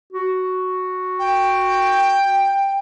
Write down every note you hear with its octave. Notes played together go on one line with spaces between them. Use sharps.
F#4
G5